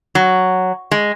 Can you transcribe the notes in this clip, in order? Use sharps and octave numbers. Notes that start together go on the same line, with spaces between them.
F#3
G#3